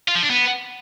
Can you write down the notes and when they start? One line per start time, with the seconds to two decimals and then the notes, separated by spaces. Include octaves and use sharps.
0.08 F4
0.15 F3
0.23 D4
0.30 B3